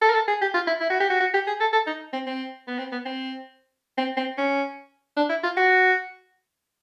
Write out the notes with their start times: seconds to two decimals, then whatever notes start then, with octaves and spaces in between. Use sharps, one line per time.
0.01 A4
0.10 A#4
0.14 A4
0.28 G#4
0.41 G4
0.54 F4
0.67 E4
0.81 E4
0.90 F#4
1.00 G4
1.10 F#4
1.20 F#4
1.34 G4
1.47 G#4
1.60 A4
1.73 A4
1.87 D#4
2.13 C4
2.26 C4
2.68 B3
2.79 C4
2.92 B3
3.05 C4
3.98 C4
4.17 C4
4.38 C#4
5.17 D4
5.29 E4
5.44 F4
5.57 F#4